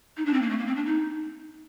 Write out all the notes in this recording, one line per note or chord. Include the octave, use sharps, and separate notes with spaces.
D#4
D4
C4
A#3
A3
A#3
C4
D4
D#4